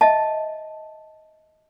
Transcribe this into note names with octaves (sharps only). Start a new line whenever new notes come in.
D#5 E5 A5